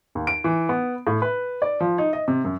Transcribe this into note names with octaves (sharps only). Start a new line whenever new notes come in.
D#2
D7
E3
B3
A2
B4
D5
F3
D#4
D#5
C3
F#2